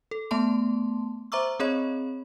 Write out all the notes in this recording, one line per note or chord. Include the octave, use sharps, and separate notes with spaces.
A4
A3 B3 A5 C6
C5 E5 A#5 C#6 D6 E6
C4 G#4 C#5 D#5 B5